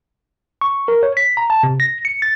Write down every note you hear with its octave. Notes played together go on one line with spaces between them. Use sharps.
C#6
A#4
C#5
B6
A#5
A5
C3
A#6
C#7
A6